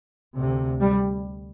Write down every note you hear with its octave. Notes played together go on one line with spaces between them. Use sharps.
D2 C3
G3